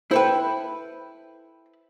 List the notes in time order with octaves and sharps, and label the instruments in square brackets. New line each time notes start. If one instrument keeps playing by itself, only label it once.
[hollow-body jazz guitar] E4 A4 B4 [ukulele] C5 G5